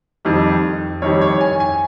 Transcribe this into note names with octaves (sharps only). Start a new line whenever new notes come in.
F2 D#3 G3
F2 D#3 G3 C#5
C#5
G#5
G#5